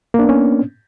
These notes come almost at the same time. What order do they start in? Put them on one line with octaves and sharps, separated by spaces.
A#3 D4 B3 C#4